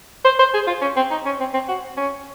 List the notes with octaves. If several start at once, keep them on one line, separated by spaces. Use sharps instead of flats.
C5
C5
G#4
F4
C#4
C4
D#4
C#4
C4
C4
F#4
C#4